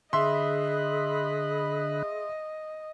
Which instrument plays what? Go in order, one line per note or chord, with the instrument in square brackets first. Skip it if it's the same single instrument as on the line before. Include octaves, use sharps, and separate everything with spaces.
[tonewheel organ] D3 B5 F#6 [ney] G#4 [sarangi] D#5 [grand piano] E5 C6